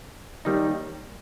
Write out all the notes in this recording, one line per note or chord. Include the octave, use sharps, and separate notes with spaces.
D#2 D#3 G3 D#4